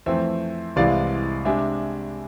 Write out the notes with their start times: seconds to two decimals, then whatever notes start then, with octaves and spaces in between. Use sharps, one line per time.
0.06 F2 E3 A3 C4 C5 E5
0.76 C2 C3 E3 G#3 D5 F5
1.45 C3 G#3 D4 E5 G#5